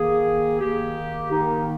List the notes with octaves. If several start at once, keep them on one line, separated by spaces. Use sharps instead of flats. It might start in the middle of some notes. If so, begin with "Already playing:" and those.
Already playing: D#3 A#3 G#4
D#3 A#3 G4
D#3 A#3 D#4